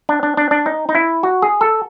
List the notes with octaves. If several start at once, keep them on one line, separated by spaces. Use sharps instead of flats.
D4
D4
D4
D4
D#4
D#4
E4
F#4
G#4
A4